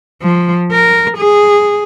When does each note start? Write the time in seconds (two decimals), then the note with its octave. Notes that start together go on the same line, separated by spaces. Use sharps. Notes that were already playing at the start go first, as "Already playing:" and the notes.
0.22 F3
0.71 A#4
1.18 G#4